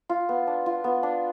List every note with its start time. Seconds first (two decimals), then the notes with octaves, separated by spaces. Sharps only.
0.09 F4
0.29 B3
0.47 D4
0.66 F4
0.84 B3
1.03 D4